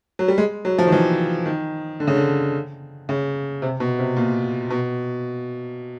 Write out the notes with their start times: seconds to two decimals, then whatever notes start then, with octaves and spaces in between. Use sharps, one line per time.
0.19 F#3
0.28 G3
0.38 G#3
0.65 F#3
0.79 F3
0.87 D#3
0.92 E3
1.46 D#3
2.00 D3
2.07 C#3
2.15 D3
3.09 C#3
3.62 C3
3.80 B2
3.99 C3
4.16 A#2
4.70 B2